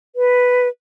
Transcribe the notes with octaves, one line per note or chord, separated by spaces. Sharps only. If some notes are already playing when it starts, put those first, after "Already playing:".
B4